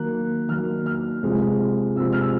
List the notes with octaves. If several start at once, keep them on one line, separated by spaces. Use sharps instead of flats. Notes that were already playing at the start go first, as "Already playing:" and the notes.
Already playing: D#3 F#3 A#3 F#6
D#3 F#3 A#3 F6
F6
C3 F3 G#3
C3 F3 G#3 E6
F6
E6